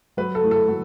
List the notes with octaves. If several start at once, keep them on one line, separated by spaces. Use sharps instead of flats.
F#3 B4
A4
A3 E4
A4
F#3